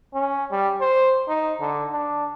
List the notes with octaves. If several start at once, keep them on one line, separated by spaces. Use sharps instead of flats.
C#4
G3
C5
D#4
D3
D4